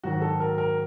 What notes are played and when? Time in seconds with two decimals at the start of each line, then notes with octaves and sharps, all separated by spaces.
0.04 G#2 D#3 F#3 F#4
0.22 A4
0.40 A#4
0.58 A#4